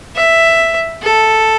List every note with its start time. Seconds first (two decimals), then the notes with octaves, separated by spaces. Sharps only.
0.16 E5
1.02 A4